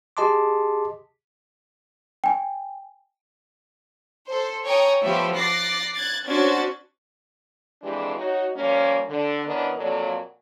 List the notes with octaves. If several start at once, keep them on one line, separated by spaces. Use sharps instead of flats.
G4 G#4 D#5 A5 C6 D6
G5 G#5
A4 C5
C#5 G5 G#5 A#5 C#6 D#6
F3 A3 B3 G4 C5 E5
D6 F#6 A6 A#6 C7
F#6 G#6 A6
C#4 D4 F#4 C5 G#6 A6
F2 E3 G#3 D4 G4
D#4 F#4 C#5
F3 G3 A#3 C#4
D3
E3 B3 C#4 D4 A#4 D#5
F2 A#2 F#3 A4 C#5 D5